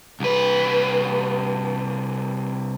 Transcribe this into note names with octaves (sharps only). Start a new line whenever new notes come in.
C2 B4